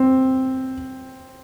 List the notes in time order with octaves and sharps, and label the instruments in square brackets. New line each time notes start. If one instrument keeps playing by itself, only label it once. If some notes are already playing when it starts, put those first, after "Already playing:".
Already playing: [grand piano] C4